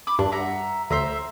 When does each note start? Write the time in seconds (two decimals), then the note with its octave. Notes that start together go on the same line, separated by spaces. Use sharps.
0.07 B5 D6
0.19 G2 D4
0.32 E5 F#5 A#5
0.91 D2 C5 E5 A#5